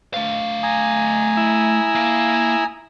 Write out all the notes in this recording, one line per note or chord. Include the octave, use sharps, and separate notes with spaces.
A3 F5
G#5 A#5 D#6
E4
A#3